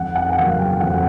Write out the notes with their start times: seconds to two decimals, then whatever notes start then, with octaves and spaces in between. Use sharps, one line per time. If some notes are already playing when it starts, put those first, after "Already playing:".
Already playing: F2 F#5
0.15 F#5
0.30 F#5
0.37 C#3 F#3 A#3 F5
0.59 G5
0.80 F2 F#5